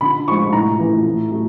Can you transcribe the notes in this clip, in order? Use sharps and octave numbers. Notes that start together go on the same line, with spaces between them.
D3 B5
F3 G#3 C#6
A2 A#5
E3 A3
A2
F#3 A3